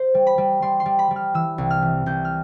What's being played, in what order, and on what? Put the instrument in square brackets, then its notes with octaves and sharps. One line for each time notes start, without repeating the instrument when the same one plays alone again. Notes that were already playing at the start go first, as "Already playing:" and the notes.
Already playing: [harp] C5
G3
B5
G3
G3 C6
C6
G3
B5
G3
F6
E3 E6
C2
F6
E3
C2 G6
F6